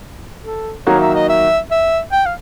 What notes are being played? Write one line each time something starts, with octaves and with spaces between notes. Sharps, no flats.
A4
D#3 F#3 A#3 D#4 F#4 C#5
E5
D#5
E5
E5
G5
F5